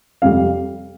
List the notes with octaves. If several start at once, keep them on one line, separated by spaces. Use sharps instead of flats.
F2 C3 G3 F5